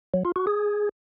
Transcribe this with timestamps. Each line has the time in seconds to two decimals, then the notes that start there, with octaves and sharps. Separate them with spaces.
0.14 F#3
0.25 F4
0.36 F#4
0.47 G#4